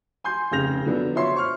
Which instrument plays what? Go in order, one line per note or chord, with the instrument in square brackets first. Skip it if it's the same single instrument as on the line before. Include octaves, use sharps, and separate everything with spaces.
[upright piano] G#5 C6 G6
F1 C#3 G6 A#6 F7
D3 F3 F#3 B3 D4
F4 F#4 C#5 E5 C6
C5 C#6 F6